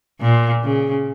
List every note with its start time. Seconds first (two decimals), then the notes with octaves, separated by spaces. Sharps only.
0.21 A#2
0.63 C#3